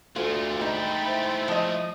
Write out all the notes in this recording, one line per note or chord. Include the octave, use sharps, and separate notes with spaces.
D2 G#3 A3 F4
D#4 G5 B5 A6
E4 C5
F3 D#5